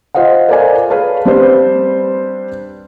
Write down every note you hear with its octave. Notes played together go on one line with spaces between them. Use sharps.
F4 C5 D#5 F5 F#5
A4 A#4 C5 D5 F5 G#5
G#4 B4 C#5 F5 A5
G3 C4 D4 G4 B4 C5